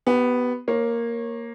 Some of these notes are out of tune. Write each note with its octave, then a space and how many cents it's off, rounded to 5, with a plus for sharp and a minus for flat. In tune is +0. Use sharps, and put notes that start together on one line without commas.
B3 +0 G4 -30
A#3 +0 C#5 -25